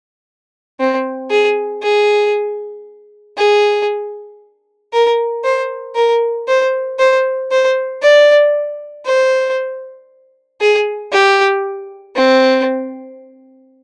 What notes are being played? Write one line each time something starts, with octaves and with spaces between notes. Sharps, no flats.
C4
G#4
G#4
G#4
A#4
C5
A#4
C5
C5
C5
D5
C5
G#4
G4
C4